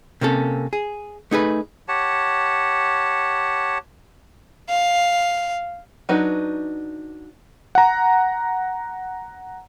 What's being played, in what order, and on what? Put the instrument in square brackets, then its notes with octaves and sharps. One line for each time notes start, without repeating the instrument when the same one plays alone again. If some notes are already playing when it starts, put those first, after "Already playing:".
[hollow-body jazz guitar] C3 A#3 C#4 A4
G#4
A3 D#4 G#4 B4
[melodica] G4 C#5 F#5 A5
[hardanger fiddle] F5
[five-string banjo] F#3 D4 D#4 B4
[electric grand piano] F#5 A#5